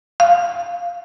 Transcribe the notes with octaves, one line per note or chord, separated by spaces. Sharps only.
F5